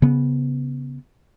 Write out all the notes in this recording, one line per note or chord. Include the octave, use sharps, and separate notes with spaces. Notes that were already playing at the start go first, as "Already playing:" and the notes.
C#3 B3